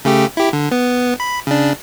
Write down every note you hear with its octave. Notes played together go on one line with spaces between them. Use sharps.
C#3 A3 G4
E4 G4
D3
B3
B5
C#3 D4